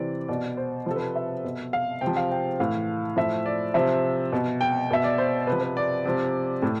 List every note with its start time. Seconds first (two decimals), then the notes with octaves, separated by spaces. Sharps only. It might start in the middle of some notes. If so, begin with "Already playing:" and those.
Already playing: C3 E3 D5
0.28 B2 D5
0.57 C5
0.86 C3 F3 A4
0.96 B4
1.16 E5
1.44 B2
1.73 F5
2.01 C3 G5
2.07 F3
2.17 F5
2.31 G5
2.60 A2 E3 F5
3.16 A2 F3 E5
3.46 D5
3.74 C3 F3 E5
4.32 B2
4.61 G5
4.91 B2 E5
5.04 D5
5.18 C5
5.47 C3 B4
5.52 F3
5.61 B4
5.77 D5
6.05 C3 F3
6.62 A2